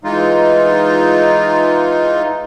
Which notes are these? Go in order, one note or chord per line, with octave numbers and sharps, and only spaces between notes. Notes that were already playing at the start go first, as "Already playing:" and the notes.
E3 G#3 D#4 F4